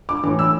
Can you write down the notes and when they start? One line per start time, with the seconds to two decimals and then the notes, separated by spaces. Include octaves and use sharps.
0.09 D6
0.23 A2 E3 D6
0.39 E6